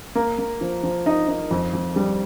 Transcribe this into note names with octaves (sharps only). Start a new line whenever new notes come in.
A#3
A#3
F3
F3
D#4
D#4
F2
F2
G3